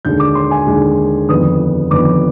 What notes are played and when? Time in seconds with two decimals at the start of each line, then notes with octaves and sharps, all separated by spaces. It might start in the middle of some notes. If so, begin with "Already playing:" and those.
0.05 D#2 D3 G#3 G6
0.20 D6
0.35 C6
0.51 G#5
0.67 D#2 D3 G#3
1.29 G1 F2 D#3 B3 D#6
1.91 G1 F2 D#3 B3 D6